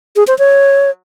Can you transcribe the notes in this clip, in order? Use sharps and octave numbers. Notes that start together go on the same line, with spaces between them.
G#4
C5
C#5